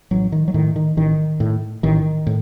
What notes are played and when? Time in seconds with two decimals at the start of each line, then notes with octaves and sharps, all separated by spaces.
0.11 A1 F#3
0.32 D#3
0.48 F#3
0.54 A2 D#3
0.76 D#3
0.97 A1 D#3
1.40 A2
1.83 A1 D#3
2.27 A2